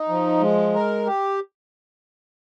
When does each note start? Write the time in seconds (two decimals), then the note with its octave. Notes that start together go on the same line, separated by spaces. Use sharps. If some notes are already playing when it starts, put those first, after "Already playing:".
Already playing: D#4
0.09 F3
0.41 G#3
0.74 A#4
1.06 G4